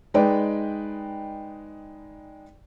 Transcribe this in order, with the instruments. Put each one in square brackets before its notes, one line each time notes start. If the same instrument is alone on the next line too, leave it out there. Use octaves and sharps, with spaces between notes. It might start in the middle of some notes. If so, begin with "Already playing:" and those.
[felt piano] G#3 D#4 B4 D5 G5